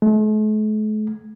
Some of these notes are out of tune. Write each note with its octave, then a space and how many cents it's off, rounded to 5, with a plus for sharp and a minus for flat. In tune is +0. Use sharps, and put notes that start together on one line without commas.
A3 -45